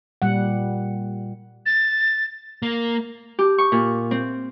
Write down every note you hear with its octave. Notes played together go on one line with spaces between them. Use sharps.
A#2 G3 F#5
A6
A#3
G4
C#6
A#2
C4